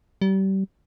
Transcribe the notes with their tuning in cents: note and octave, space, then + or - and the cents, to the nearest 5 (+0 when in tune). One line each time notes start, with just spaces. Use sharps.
G3 -30